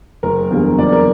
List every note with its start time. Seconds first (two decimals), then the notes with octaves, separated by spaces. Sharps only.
0.23 F#1 A#4
0.50 E2 D3 G3 A#3
0.78 F#1 D5
0.92 A#4